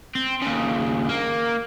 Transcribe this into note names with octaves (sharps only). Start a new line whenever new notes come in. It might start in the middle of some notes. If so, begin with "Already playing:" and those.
C4
D#2 C#3
A#3